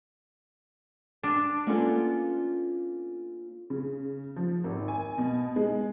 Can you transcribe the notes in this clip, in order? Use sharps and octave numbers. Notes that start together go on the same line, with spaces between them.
D4
A#3 B3 C#4 D4 F4 A4
C#3
F3
G#1
G#5
B2
G#3